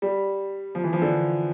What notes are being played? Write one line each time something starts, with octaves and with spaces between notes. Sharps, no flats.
G3
F3
E3
F3
D3